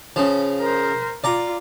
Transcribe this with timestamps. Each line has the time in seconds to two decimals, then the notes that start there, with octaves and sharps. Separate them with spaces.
0.16 C#3 F3
0.61 A#4 C5
1.24 F4 D5 A#5